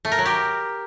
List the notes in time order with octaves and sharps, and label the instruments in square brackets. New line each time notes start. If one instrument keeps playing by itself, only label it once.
[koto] A3
A#4
F#3
G4